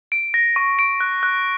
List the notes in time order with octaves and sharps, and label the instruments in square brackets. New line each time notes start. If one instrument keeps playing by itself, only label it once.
[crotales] D7
A#6
C#6
D7
F#6
F#6